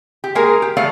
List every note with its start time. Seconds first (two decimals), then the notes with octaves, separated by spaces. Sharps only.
0.24 G4
0.35 G#3 A#3 G#4 A#4
0.62 G4
0.77 A3 B3 A4 D5 F5